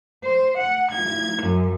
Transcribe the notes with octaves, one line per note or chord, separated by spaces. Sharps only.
C5
F#5
G#6
F#2